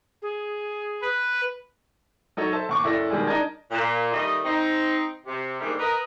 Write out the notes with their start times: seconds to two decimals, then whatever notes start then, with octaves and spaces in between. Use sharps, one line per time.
0.22 G#4
1.02 B4
2.37 F#3 D#4 A4 C#5
2.53 A4 C5 E5 A5
2.69 D#2 C#6 D6
2.84 F#1 E4 A4 D5 A#6
3.10 B2 D#3 G3 G#3 G#4
3.27 D4 D#4 A#4 D5 A5 G#6
3.71 A#2
4.13 D#3 G3 A3 D#5
4.45 C4 D#4
5.26 C3
5.61 G#2 D3 D#3 G3 A3 A#3
5.79 A#4 B4 D#5